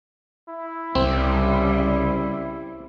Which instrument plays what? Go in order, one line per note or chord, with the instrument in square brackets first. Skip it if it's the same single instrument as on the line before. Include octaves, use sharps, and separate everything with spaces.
[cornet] E4
[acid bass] C2 [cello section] C#3 G3 [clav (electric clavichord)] C4